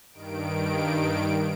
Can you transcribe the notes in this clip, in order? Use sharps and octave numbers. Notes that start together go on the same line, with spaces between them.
G2 D#3 D7